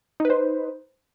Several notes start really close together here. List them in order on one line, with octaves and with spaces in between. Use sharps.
D#4 B4 C5